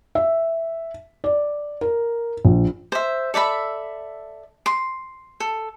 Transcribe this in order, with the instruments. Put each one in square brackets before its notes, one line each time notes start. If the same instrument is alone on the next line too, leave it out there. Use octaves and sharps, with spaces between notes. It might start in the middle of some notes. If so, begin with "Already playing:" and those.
[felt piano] E5
D5
A#4
A#1
[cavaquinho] C5 E5
A4 D5 E5 B5
C6
A4